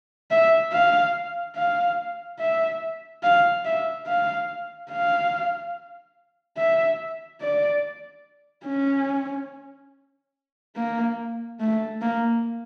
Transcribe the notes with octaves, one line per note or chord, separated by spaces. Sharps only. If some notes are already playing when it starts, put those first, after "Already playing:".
E5
F5
F5
E5
F5
E5
F5
F5
E5
D5
C#4
A#3
A3
A#3